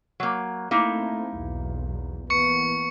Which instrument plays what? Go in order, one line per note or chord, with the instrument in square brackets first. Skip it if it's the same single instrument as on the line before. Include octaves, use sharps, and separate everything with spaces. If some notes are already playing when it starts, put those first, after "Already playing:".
[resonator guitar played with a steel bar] F#3 A#3
[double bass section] A3 C4 [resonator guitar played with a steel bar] A#3 D#4 E4
[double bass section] B1 E2
[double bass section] E3 A#3 B3 [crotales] C#6 C#7